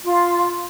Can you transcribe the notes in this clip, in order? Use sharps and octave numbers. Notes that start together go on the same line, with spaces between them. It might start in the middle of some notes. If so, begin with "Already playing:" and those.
F4